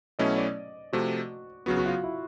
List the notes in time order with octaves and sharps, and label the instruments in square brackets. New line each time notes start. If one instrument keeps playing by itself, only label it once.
[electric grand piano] B2 F#3 A3 C#4 E4 [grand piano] D#5
[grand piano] D5
[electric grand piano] C3 F3 A3 [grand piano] F#4
[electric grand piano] C#3 F#3 B3 [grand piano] F#4
[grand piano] F#4
F4
E4